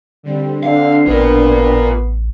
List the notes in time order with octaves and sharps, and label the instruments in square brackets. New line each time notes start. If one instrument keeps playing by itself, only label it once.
[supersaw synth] D3 G3 C4
[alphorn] D3 [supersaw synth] C4 D4 [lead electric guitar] F5
[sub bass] A1 [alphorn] B3 [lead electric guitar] F4 A#4